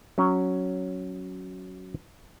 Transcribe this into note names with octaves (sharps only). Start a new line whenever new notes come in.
F#3 C#4